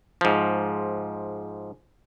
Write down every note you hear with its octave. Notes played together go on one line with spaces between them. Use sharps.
G#2 F3